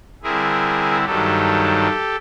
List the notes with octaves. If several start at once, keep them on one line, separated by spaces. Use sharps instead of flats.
D3 G3 C4 E4 G#4 A#4
G2 D#3 F#3 G4 A4